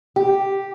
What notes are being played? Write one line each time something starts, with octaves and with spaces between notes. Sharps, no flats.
G4